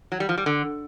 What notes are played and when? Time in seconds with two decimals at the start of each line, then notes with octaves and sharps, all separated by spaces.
0.12 F#3
0.20 G3
0.29 F3
0.38 G3
0.46 D3